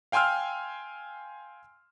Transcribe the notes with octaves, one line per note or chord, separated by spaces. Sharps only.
F5 G5 G#5 C6 E6 F6